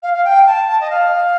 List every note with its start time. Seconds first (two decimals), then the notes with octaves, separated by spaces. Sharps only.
0.03 F5
0.14 F5
0.24 G5
0.46 A5
0.69 A5
0.81 D#5
0.90 F5